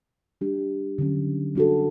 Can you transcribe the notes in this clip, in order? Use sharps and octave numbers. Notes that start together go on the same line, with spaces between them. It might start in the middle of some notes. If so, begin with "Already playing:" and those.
G3 D4 G4
D3 F#3 C#4
G3 D4 F#4 A4